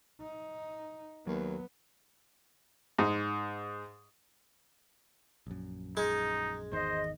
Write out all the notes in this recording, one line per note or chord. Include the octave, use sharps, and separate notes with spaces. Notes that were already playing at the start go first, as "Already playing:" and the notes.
D#4
D#2 F#3 B3
G#2
A#1 F#2
G#3 D#4
G#1 E2 D#3 C5 D#5